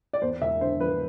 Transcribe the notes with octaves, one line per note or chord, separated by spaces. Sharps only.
D5
E2 C5
E1 E5
D3 C5
F3 B4